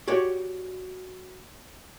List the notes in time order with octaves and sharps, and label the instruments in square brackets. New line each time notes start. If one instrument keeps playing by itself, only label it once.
[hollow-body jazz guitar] F#4 G4 C#5 D5